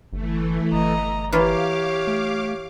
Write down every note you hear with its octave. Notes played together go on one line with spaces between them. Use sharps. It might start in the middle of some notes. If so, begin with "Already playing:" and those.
G1 E3 A3
G1 D#5 A#5
E3 A#3 F4 G4 C#5 F5 D6
A3